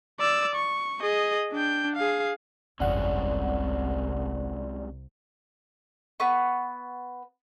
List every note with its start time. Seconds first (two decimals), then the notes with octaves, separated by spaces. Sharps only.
0.20 D5 E6
0.55 C#6
1.02 G#4 D#5
1.52 D4 G5
1.96 G#4 F5
2.80 G1 C2 F2 C3 G#3 C#4 D5 F#5
6.20 B3 B4 C#6